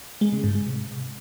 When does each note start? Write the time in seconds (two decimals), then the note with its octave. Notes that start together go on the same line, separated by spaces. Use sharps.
0.21 G#3
0.33 C#3
0.44 G#2
0.55 G#3
0.66 C3